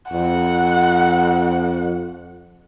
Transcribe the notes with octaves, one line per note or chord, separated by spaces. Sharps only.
F2 F#5